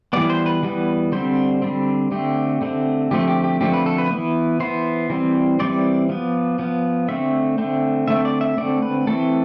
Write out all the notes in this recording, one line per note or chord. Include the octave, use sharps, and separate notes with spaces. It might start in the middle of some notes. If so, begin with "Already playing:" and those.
E3 G3 B3 D5
C5
B4
E3 G3 B3
D3 G3 C4 C5
D3 G3 C4
D3 A3 C4 G4
D3 A3 C4
D3 F3 A3 C4 G4
G4
G4
D3 F3 A3 C4 G4
B4
A4
B4
E3 B3
E3 B3 C5
E3 G3 C4
E3 G3 C4 D5
F3 B3
F3 B3
D3 A3 C4 E5
D3 A3 C4
D3 A3 C4 E5
D5
E5
D3 A3 C4 D5
B4
E3 A3 C4 A4